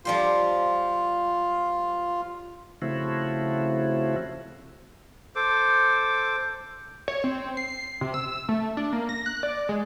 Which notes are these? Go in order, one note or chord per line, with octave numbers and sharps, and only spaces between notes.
F3 G3 F4 C5
C#3 F3 A3 C4 E4 F#4
A4 C5 D6
C#5
C4
C7
C3
E6
A3
D4
A#3
A#6
F#6
D5
G#3